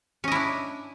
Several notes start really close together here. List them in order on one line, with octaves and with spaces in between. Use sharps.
C#4 D#5 E4 D4